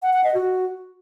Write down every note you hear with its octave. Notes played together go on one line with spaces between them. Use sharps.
F#5
F#5
D#5
F#4